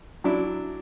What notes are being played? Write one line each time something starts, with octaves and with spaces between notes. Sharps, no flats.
F#3 D4 E4